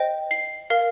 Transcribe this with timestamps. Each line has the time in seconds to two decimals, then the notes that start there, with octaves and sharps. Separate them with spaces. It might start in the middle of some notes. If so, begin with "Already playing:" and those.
Already playing: C5 D#5 G5
0.31 C7
0.70 A#4 F5